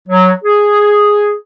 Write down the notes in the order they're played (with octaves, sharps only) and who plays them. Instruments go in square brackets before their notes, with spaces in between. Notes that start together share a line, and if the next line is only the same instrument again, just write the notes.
[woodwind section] F#3
G#4